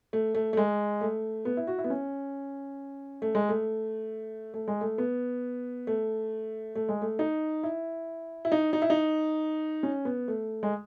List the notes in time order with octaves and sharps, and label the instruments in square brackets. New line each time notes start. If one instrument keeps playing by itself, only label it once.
[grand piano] A3
A3
A3
G#3
A3
B3
E4
F#4
E4
B3
C#4
A3
G#3
A3
A3
G#3
A3
B3
A3
A3
G#3
A3
D#4
E4
E4
D#4
D#4
E4
D#4
C#4
B3
A3
G#3